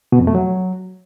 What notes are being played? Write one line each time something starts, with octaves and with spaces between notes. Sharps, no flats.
B2
F2
A3
F#3